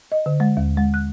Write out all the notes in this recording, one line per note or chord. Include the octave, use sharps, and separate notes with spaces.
D#5
D3
G#3
D#2
G#3
F#6